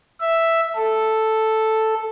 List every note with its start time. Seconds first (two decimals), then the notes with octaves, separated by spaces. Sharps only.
0.20 E5
0.76 A4